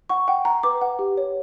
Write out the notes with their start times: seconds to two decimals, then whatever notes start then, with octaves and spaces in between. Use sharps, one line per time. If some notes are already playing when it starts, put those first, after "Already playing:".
0.09 F#5 C#6
0.28 F#5 G5
0.45 F#5 A#5
0.63 B4 D6
0.81 F#5
0.99 G4
1.17 C#5